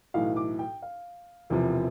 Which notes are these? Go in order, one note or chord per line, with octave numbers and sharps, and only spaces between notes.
B1 A2 E3 F5
D6
G5
F5
E1 E2 C3 F3